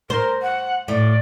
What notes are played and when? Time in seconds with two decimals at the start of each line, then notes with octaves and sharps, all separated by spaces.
0.10 A#4 C5
0.42 F#5
0.88 A2 D5